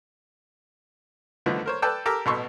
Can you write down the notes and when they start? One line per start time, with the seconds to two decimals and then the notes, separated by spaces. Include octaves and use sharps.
1.46 D3 D#3 F3 A3 B3
1.66 A#4 C5 C#5
1.82 A4 B4 D5 G5 A5
2.06 G4 A4 A#4 A#5 D6
2.26 A1 B2 B3 A4 C6 C#6